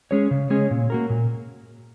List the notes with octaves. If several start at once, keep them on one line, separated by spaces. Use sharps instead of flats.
G#3 C#4 G#4 C#5
C#3
G#3 C#4 G#4 C#5
A#2
A#3 F#4 A#4
A#2